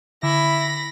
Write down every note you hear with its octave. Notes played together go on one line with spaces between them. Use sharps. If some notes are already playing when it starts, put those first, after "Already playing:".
D3 E4 B5 A#6